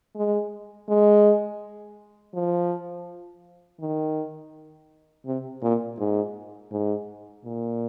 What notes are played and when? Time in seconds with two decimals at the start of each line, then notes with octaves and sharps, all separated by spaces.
0.16 G#3
0.89 G#3
2.34 F3
3.80 D#3
5.26 C3
5.62 A#2
5.99 G#2
6.72 G#2
7.45 A#2